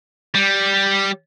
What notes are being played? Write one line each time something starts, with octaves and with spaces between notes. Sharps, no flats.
G3